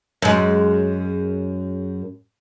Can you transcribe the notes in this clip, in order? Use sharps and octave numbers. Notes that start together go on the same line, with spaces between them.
F#2 G#3